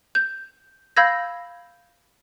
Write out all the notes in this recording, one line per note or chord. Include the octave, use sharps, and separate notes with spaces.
G6
F5 B5 E6 G6 G#6 A#6